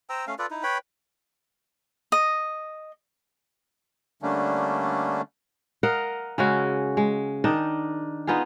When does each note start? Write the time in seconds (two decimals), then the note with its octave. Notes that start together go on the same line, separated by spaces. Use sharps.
0.09 C5 G5 A#5 E6
0.27 A3 C#4 F5
0.39 F4 A4 B4 D5
0.50 D#4 E4
0.63 B4 C#5 G5 B5
2.12 D#5
4.22 D3 G3 A3 A#3 C#4 D4
5.83 A#4 D#5 F5 F#5
6.38 C#3 G#3 C#4 F#4
6.97 G#3
7.44 D#3 D4 D#4 D#5
8.27 B3 D#4 F4 G#4